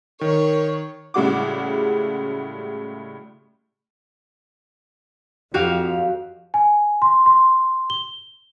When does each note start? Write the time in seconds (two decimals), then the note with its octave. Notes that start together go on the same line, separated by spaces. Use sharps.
0.21 D#3 A#4 C#5
1.14 A2 C#3 G3 G#3 F#4 D6
5.54 F2 F#4 G4 F5
6.54 G#5
7.02 C6
7.26 C6
7.90 G7